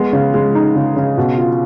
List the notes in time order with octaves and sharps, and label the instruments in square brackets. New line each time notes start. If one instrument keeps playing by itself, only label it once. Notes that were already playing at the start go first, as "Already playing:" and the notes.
Already playing: [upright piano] G#3 B3
C#3
G#3
D#4
C#3
C#3
B2
F4